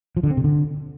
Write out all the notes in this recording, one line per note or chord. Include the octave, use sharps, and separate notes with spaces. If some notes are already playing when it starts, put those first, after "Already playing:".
F3
D3
C4
C3
D3